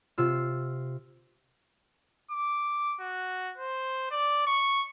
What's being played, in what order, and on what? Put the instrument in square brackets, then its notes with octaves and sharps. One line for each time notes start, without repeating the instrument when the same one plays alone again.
[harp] C3 F4 E6
[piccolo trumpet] D6
F#4
C5
D5
C#6